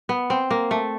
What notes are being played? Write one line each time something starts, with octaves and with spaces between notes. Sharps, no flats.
B3
C4
A#3
A3